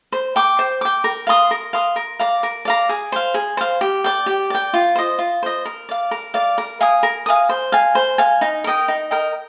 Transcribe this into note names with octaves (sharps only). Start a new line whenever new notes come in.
C5
G5 D6
C5
G5 D6
A#4
F5 C6 D#6
A#4
F5 C6 D#6
A#4
D5 F5 A#5
A#4
D5 F5 A#5
G#4
C5 F5
G#4
C5 F5
G4
D5 G5
G4
D5 G5
F4
C5 D#5
F4
C5 D#5
A#4
D5 F5
A#4
D5 F5
A#4
F5 G#5 D#6
A#4
F5 G#5 D#6
C5
F5 G#5
C5
F5 G#5
D#4
A#4 D#5 G5
D#4
A#4 D#5 G5